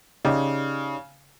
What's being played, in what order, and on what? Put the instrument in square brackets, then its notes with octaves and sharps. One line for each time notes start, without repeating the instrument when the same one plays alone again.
[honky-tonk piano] C#3 [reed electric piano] D#4 G4 D5